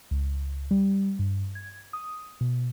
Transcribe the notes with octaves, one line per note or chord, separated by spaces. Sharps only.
C#2
G3
G2
G#6
D#6
B2